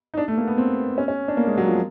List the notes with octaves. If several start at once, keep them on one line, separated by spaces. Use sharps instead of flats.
D#4
D4
A3
A#3
B3
C4
C#4
C#4
D4
A#3
G#3
F#3
F3